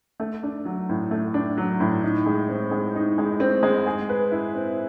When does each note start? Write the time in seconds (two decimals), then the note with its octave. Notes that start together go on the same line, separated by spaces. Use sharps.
0.20 A3
0.43 D4
0.65 F#3
0.89 A2
1.11 A3
1.34 D4
1.57 F#3
1.80 A2
2.03 D#4
2.26 G#3
2.49 C4
2.71 G#3
2.95 D#4
3.18 G#3
3.40 C4
3.63 G#3
3.86 G#4
4.09 B4
4.32 E4
4.55 C4